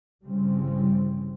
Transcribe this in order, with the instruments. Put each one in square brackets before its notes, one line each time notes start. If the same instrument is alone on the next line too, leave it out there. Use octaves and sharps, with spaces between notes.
[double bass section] G1 C#3 E3 G3 C4